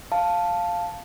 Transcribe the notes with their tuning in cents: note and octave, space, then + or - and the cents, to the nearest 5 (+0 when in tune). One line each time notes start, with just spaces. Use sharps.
F5 +0 A5 +0